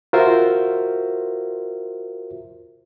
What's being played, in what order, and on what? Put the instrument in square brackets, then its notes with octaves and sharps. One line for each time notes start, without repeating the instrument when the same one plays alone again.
[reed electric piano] F4 F#4 A#4 C5 E5